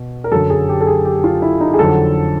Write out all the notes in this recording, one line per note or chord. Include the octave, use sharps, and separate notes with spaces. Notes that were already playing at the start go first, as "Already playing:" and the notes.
Already playing: B2
A#4
F#2 D3 F#3 A4
G#4
G4
A4
G#4
G4
F4
E4
D#4
G#4
F2 D3 F#3 A4